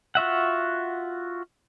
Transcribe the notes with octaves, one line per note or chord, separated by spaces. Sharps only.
F4 F#4 E5 F#5